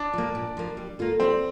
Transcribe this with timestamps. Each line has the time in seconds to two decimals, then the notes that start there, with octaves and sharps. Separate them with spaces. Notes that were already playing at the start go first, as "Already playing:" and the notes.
Already playing: D4
0.13 F3 A#3
0.35 A#2
0.57 F3 A#3
0.77 G3
0.99 A#3 F4 A4
1.20 G3 C4